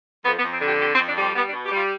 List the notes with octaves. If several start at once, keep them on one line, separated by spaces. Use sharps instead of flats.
F2 B3
B3
F2
C4
D3
G4
F2 G4
C4
F2
D4
G3 C4
G3 B3
D4
B2
G4
G3 F4